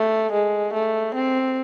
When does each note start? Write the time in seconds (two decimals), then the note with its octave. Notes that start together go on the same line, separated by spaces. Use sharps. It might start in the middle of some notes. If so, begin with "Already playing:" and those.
Already playing: A3
0.33 G#3
0.74 A3
1.15 C4